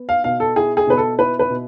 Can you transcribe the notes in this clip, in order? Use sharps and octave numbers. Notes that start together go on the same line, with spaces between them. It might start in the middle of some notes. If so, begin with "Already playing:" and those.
Already playing: B3
F5
B2 F5
A4
E4 G#4
G#4
B2 B4
A4
E4 B4
B4
B2